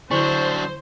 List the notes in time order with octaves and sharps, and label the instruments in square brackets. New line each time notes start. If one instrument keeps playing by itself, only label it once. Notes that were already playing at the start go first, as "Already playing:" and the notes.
[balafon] D3 E4 [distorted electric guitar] F#3 D4 [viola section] C5 [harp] C#6